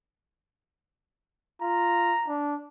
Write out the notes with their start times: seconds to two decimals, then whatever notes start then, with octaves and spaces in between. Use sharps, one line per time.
1.62 F4 A#5
2.28 D4